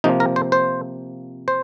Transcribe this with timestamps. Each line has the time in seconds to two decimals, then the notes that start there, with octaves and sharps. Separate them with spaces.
0.04 C3 F3 A#3 D#4
0.20 A#4
0.36 C5
0.52 C5
1.48 C5